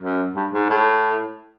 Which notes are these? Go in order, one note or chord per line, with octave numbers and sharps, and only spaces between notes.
F#2
G2
G#2
A2